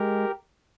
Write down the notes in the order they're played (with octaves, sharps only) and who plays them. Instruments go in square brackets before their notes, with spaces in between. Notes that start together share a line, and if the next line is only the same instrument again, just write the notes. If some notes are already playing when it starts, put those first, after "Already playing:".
Already playing: [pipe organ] G#3 G4 A#4